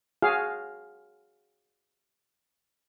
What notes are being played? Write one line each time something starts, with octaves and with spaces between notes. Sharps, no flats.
F#4 G#4 F5